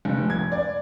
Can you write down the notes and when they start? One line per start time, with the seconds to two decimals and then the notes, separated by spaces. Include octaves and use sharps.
0.05 F1
0.30 G#6
0.52 D5